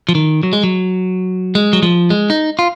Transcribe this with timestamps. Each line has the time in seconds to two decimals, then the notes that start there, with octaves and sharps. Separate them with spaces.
0.09 F3
0.15 D#3
0.43 F#3
0.53 G#3
0.63 F#3
1.55 G#3
1.73 F#3
1.83 F3
2.10 G#3
2.30 D#4
2.59 F4